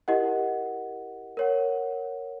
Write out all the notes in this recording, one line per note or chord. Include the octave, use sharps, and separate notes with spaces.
E4 G4 A#4 D#5 F#5
A#4 C#5 F#5